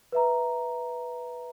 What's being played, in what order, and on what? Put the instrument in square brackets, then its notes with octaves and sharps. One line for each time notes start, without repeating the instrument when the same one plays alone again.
[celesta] B4 E5 A#5